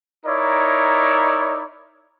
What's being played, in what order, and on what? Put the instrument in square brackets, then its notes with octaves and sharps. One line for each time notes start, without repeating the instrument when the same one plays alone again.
[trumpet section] D#4 E4 A#4 C#5 D5